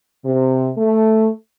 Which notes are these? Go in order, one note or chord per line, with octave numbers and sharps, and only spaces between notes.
C3
A3